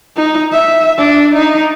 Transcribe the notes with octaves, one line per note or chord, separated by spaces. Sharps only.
D#4
E5
D4
D#4